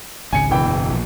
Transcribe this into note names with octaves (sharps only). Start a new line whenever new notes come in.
G#1 C#2 C#3 G#5 C#7
E1 E3 G5
F#1
A#1